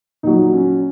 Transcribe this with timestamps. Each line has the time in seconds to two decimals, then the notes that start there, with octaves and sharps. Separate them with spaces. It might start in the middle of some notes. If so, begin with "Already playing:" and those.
0.23 A#2 F#3 D#4
0.53 C#4